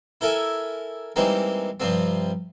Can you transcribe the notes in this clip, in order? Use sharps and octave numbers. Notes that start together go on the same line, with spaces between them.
E4 A4 A#4 E5 G#5
E3 G3 G#3 A#3 C4 D#4
G2 C3 F3 G3 C4